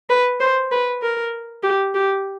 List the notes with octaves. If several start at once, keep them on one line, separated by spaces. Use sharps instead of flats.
B4
C5
B4
A#4
G4
G4